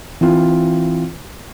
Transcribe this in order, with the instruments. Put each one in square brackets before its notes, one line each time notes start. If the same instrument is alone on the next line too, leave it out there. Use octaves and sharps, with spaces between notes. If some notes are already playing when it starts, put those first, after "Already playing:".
[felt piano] E3 C4 F4